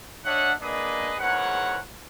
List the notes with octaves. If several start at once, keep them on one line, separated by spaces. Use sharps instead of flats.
D4 C#5 D#5 E5 F#5
A#3 D4 G#4 B4 D#5
E2 G#2 A#4 B4 C#5 F#5